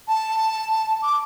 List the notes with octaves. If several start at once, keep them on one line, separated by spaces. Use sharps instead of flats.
A5
D6